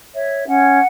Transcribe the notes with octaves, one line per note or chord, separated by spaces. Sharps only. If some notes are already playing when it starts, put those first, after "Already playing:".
C#5 E5
C#4 F#5